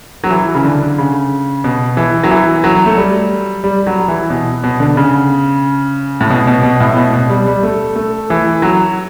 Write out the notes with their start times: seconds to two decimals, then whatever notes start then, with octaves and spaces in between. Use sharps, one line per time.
0.24 F#3
0.31 E3
0.55 C#3
0.64 D3
0.98 C#3
1.64 B2
1.97 E3
2.24 F#3
2.31 E3
2.64 F#3
2.86 A3
2.97 G3
3.64 G3
3.87 F#3
4.08 E3
4.30 B2
4.64 B2
4.80 D3
4.97 C#3
6.21 A2
6.30 B2
6.47 B2
6.63 B2
6.80 A2
6.97 B2
7.13 B2
7.30 G3
7.47 G3
7.63 A3
7.96 A3
8.30 E3
8.62 F#3